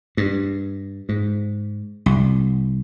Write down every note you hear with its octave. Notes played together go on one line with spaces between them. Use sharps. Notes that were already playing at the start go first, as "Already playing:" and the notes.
G2
G#2
C2